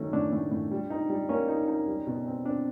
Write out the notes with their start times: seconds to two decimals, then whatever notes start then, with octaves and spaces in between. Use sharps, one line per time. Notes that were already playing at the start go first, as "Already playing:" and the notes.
Already playing: D#3 F#3 A3 C#4 D#4
0.13 A2 D4
0.32 A2
0.51 A2
0.71 G3
0.90 D#4
1.10 G3
1.29 A#3 C#4
1.48 D#4
1.68 D#4
1.88 G3
2.07 B2
2.26 C4
2.45 C4 D4